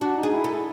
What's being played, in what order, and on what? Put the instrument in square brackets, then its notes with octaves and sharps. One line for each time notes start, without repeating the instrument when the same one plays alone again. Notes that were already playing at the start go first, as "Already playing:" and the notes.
[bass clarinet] D4 [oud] F#4
[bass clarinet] D#4
[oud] G#4
[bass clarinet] E4
[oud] A4